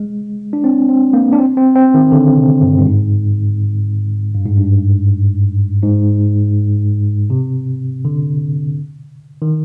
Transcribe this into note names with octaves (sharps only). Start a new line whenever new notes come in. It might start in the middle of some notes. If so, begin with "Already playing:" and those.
Already playing: G#3
D4
C4
C4
A#3
D4
C4
C4
C4
D#3
D3
C3
G2
G2
G#2
G2
G#2
G2
G#2
C3
D3
D#3